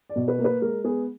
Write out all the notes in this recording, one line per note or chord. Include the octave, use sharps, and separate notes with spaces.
D5
B2
B4
A#3
B4
G#3 A#4
B3 G#4